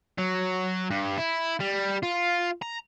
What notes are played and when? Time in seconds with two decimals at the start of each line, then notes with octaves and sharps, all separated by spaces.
0.18 F#3
0.91 G2
1.18 E4
1.60 G3
2.03 F4
2.62 A#5